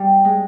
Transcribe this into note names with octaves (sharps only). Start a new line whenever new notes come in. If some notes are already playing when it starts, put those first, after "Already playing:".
Already playing: G3
G#3